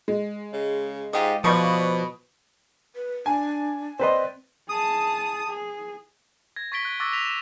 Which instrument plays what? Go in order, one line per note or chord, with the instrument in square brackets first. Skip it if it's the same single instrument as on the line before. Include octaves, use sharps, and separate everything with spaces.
[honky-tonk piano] G#3
[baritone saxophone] C#3
[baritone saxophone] G#2 [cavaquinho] F4 G4 D#5
[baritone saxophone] B2 [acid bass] F3 [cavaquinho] B4 C#6 [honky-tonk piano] D5 B5 D#6
[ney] B4
[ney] D4 [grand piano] G#5
[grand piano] C4 B4 C6 [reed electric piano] C5 D#5 [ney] D5
[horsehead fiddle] G#4 A5 [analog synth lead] D#6
[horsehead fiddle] G#4
[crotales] G#6 A#6
C#6 A6 B6 D7 G7
F#6 G7
C#6 D6 E6 F#6 A6 A#6
A#6 B6 F7
E7 F7